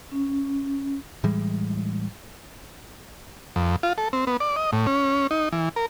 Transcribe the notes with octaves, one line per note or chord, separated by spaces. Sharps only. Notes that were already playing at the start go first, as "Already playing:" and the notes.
C#4
A2 E3 G3 G#3
F2
F4
A4
C4
B3
D5
D#5
A2
C#4
D#4
E3
A#4